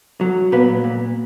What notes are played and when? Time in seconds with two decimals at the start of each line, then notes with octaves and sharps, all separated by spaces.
0.21 F#3
0.52 A#2 B3
0.84 A#2